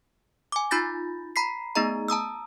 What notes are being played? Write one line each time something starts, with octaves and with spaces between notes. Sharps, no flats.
G#5 D6
D#4 F4 B5 G6 A6 A#6
A#5 B5 B6 C7
A3 B3 D#4 G#4 D#5 A#5
A5 A#5 D#6 E6